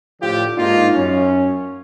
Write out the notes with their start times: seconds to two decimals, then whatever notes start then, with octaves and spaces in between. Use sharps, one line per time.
0.21 A2 D3 F3 F4 G4
0.58 G#2 A#3 D4 D#4 F4
0.95 F#2 C#4